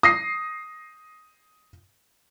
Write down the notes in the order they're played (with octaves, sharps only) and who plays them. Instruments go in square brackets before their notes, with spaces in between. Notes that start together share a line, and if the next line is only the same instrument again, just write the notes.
[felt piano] D#6 A#6 C7